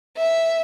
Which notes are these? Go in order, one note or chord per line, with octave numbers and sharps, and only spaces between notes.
E5